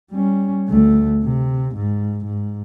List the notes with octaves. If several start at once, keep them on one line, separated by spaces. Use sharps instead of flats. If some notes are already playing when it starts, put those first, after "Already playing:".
G3 C#4
D2 A3
C3
G#2
G#2